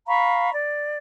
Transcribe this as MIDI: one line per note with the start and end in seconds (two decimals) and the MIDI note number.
0.07 0.51 77
0.07 0.51 82
0.07 0.51 83
0.07 0.51 85
0.53 0.98 74